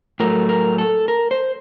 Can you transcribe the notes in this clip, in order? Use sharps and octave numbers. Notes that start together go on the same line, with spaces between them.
A2 F#3 A3 A#4
A#4
A4
A#4
C5